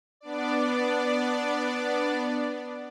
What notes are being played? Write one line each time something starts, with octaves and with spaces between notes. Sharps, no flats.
B3 D4 D5